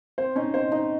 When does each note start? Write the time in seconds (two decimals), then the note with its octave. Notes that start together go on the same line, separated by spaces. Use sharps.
0.18 C4 C5
0.36 C#4 D#4
0.54 C4 C5
0.72 D#4 C5